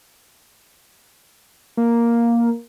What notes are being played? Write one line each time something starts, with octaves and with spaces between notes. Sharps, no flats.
A#3